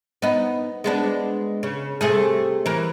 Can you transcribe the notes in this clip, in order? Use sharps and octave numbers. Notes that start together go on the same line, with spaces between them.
B3 D#4
G#3 B3 D4
C#3
C3 A3 G#4
E3 A#4